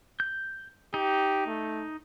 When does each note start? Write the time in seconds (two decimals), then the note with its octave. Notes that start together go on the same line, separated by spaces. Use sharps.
0.20 G6
0.94 D#4 G4
1.47 A3